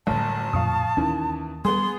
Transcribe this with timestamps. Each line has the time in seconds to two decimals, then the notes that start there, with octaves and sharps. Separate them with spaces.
0.07 G1 F#2 A2 D3 A5
0.53 F2 A#2 F3 F5 C#6 D#6
0.97 D#2 D#3 E3 C#4
1.65 G3 B3 G#4 C6